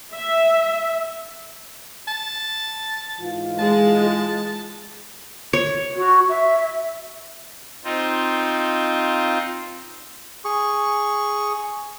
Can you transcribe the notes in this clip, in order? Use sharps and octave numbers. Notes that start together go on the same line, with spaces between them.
E5
A5
G#2 E3 F4
G#3 A5
C#5
F#4
E5
C4 D#4 F4
G#4 C#6